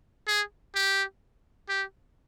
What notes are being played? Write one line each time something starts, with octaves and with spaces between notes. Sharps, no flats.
G#4
G4
G4